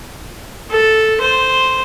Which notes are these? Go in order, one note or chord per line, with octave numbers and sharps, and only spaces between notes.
A4
C5